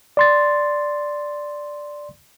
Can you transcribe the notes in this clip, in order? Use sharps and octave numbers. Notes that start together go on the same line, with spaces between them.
D5 C6 A6